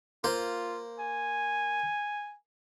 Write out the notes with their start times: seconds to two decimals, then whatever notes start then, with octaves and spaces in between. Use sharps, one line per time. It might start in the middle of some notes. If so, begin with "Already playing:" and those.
0.24 A#3 F4 C5
0.99 G#5